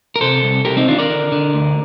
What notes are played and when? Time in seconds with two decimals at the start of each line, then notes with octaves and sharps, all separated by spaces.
0.16 A#4
0.21 C3 A4 C5
0.43 C2
0.65 C2 G4 A#4
0.77 C4 D#4
0.88 D#3 D4 F4
0.99 A#4 D5
1.10 D3
1.32 D3
1.54 D2